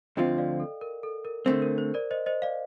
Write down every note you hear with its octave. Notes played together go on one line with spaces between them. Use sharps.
D2 D3 F3 C4 F4 D#5 G5
D5 F5
A4
A#4
A4
A#4
D3 A3 C4 A#4
A#4
C5
A#4 D5
C5 D#5
C5 D#5
D5 F5